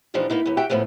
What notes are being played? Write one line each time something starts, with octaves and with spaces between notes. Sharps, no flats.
A#2 E3 F3 D4 D#4 G4
A#3 B3 D#4 E4
D#2 B3
F#4 G4 E5 F#5 G5
A2 C#3 F3 A3 B3